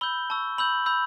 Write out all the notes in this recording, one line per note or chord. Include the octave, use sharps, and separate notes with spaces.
B5 E6 G6 G7
A5 C#6 E6
B5 E6 G6 F#7
B5 E6 G6